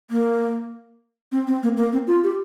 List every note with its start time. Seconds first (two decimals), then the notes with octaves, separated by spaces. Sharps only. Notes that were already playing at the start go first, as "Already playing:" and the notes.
0.11 A#3
1.32 C4
1.47 C4
1.63 A#3
1.77 A#3
1.93 C4
2.07 F4
2.23 G4